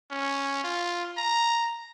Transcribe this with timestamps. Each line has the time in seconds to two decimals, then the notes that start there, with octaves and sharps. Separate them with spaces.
0.11 C#4
0.64 F4
1.17 A#5